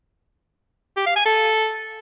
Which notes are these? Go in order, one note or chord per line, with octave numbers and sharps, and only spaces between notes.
G4
F5
G#5
A4